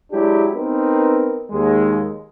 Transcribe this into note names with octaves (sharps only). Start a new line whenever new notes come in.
F#3 G#3 D4 E4 G4
B3 C4 D#4 A#4 B4
D#2 G#3